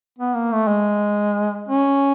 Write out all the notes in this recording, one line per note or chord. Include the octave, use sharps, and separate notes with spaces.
B3
A#3
A3
G#3
C#4